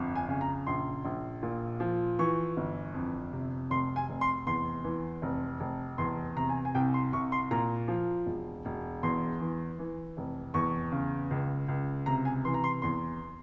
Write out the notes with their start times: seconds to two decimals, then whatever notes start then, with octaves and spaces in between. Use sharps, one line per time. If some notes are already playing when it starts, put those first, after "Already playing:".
Already playing: G1 F2
0.15 G#5
0.28 C#3 G#5
0.41 A#5
0.67 A#1 C6
1.05 A#1
1.43 A#2
1.80 F3
2.19 E3 C#6
2.57 G1
2.94 F2
3.33 C3
3.70 F1 C6
3.96 G#5
4.09 F1
4.21 C6
4.46 E2 C6
4.84 E3
5.22 F1
5.60 F1
5.98 E2 C6
6.36 C3 A#5
6.49 G#5
6.65 G#5
6.75 C2 G5
6.94 C6
7.13 C2 C#6
7.32 C6
7.51 A#2 A#5
7.88 F3
8.26 E1
8.65 E1
9.03 E2 C6
9.41 E3
9.79 E3
10.17 F1
10.54 E2 C#6
10.92 C#3
11.31 C#2
11.68 C#2
12.06 C3 A#5
12.25 G#5
12.44 E3 C6
12.54 A#5
12.64 C6
12.82 E2 C6